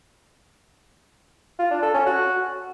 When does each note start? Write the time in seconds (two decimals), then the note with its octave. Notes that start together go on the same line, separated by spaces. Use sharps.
1.59 F4
1.71 D4
1.83 A4
1.94 C#4
2.06 F#4